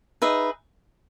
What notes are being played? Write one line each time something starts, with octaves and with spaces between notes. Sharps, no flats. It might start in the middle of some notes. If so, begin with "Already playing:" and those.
D#4 G#4 B4 E5